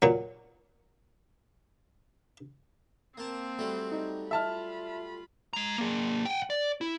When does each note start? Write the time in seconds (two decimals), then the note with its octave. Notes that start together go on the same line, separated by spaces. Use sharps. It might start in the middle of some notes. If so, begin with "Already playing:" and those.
0.02 A#2 F#3
3.18 A#3 C4 A5
3.59 F#3 G3 A3
3.91 D#4
4.31 F4 E5 A5 B5 F6
5.53 G#3 A#5
5.78 A#3 G#4
6.25 F#5 G5
6.50 D5
6.81 E4